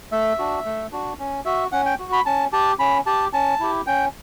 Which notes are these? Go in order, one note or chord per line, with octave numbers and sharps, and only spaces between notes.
A3 E5
D4 F#4
A3
D4 F#4
C#4
F#4 E5
C#4 F#5
G5
F#4
B5
C#4 A5
G4 A5
C#4 B5
G4 A5
C#4 A5
E4 G4
C#4 G5